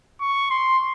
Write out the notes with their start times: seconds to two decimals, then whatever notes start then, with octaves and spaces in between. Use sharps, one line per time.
0.21 C#6
0.50 C6